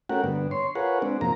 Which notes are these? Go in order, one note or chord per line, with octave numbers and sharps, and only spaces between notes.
A3 C#4 F#4 G4 A#4 F#5
G2 D3 B3
C#5 C6
F4 G#4 A#4 B4 C#5 F#5
G#3 C4 D4
F#2 C3 F3 A#3 A#5